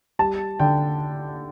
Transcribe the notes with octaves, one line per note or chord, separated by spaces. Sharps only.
G3 A5
D3 G5